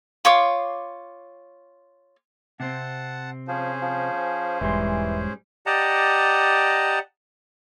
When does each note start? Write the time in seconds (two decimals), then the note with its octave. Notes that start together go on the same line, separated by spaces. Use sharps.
0.25 F4 C#5 C6 D6
2.60 C3 C4 F#5 A5
3.48 F3 C#4 G#4 C5
3.82 F3
4.61 E1 G#2 E3 G3 C6
5.66 G4 D5 D#5 F#5 A5 A#5